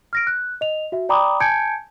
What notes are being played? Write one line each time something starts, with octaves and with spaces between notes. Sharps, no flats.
F6 A#6 D7
F#6
D#5 F7
F#4 E5
D5 G5 A#5 B5 D6 D#6
G#5 A5 G6 G#6 C#7 D7